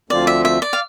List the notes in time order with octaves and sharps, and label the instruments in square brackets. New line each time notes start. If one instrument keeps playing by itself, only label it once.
[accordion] D2 D3 F3 C4 F4 [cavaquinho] D5
[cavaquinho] E5
E5
D5
F5